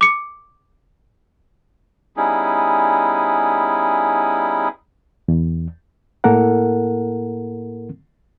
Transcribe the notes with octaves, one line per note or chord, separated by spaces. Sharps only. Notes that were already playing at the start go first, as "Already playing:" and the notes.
D6 C#7
G3 B3 C#4 D#4 E4 G#4
E2
A2 A#3 E4 A4 A#4 F#5